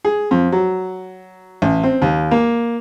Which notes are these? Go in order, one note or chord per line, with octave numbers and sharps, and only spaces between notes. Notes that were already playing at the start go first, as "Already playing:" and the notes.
G#4
F2
F#3
A1
C4
D#2
A#3